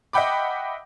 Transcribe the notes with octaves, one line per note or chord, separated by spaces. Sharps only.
D#5 E5 F#5 G5 B5 D6